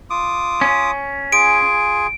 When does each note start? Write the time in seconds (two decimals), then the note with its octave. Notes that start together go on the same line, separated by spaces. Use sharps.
0.10 F4 D6 D#6
0.61 C#4
1.32 F4 G#4 G#5 D7